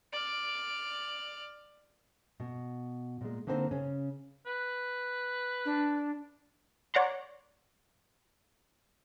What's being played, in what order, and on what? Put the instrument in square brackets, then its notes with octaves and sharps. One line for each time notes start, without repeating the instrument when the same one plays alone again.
[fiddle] D5 F6
[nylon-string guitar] B2
A#2 G#3
D3 A#3 C4 D#4 A4 C5
C#3 C#4
[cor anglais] B4
[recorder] D4
[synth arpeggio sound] C#5 D5 F#5 A#5 C6